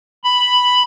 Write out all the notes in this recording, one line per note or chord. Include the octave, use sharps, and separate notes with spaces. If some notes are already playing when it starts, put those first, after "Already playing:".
B5